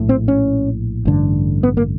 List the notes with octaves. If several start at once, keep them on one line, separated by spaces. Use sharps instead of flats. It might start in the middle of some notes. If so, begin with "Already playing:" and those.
Already playing: A#1 A2
C4
C#4
A1 G2 D3
B3
A#3